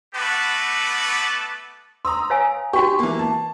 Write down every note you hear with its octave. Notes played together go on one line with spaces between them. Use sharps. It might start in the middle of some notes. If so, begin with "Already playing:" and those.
A3 B3 F#4 B4 A5 D6
A#5 C6 D#6 E6
C#5 F5 G#5
D#4 F#4 G4 C#6
E3 A#3
A5